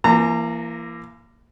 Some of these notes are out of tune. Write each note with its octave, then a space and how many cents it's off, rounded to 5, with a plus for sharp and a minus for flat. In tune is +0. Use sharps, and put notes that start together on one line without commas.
E3 +35 A#3 +0 A#5 -30